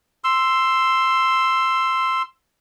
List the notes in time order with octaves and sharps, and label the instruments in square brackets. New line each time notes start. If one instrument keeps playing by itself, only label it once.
[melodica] C6 E6